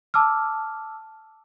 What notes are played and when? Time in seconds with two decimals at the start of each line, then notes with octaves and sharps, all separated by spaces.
0.14 A5 D6 E6 F6